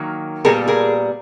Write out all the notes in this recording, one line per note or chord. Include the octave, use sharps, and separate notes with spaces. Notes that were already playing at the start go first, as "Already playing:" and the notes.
Already playing: D#3 F#3 A#3
A#2 G3 B3 G#4 A#4
G#4 A#4